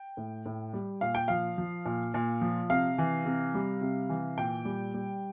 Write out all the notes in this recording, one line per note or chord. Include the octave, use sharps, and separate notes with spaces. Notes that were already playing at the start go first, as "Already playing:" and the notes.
Already playing: G5
A2
A2
G3
A#2 F5
G5
F3 F5
F3
A#2
A#2
F3
C3 F5
E3
C3
G3
C3
E3
A#2 G5
G3
G3